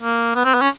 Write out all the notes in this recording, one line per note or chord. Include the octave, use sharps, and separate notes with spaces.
A#3
B3
C4
B3
C#4